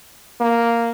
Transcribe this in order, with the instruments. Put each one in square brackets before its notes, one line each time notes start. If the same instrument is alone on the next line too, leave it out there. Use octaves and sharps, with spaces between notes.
[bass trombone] A#3